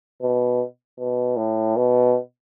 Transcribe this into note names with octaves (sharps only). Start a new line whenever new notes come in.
B2
B2
A2
B2